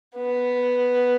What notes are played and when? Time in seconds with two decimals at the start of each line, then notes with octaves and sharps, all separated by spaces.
0.17 B3